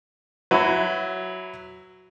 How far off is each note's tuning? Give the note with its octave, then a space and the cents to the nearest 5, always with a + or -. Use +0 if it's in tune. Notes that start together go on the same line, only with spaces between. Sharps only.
F#3 +0 E4 +0 B4 +30